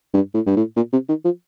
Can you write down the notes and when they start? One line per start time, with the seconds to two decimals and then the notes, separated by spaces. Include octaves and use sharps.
0.14 G2
0.34 A2
0.46 G2
0.56 A2
0.76 A#2
0.93 C3
1.09 D#3
1.25 F3